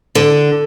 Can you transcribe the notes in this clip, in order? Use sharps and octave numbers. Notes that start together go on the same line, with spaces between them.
D3